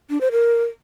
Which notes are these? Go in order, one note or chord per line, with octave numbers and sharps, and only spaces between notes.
D4
C5
A#4